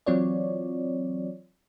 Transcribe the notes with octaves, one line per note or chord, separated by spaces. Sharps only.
E3 F#3 C4 F4 C#5 D5